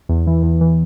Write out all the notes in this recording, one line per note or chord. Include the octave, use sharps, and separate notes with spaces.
E2
E3
E2
E3